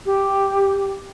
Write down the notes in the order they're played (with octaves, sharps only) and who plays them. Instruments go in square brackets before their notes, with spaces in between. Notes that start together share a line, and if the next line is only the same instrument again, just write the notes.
[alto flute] G4